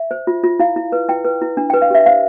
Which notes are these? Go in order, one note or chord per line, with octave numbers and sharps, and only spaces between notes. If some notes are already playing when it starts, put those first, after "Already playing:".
Already playing: E5
C5
F4
F4
E4 F5
E4
B4
E4 G5
B4
E4
D4
B4 G5
F5
G4 E5
C5 F5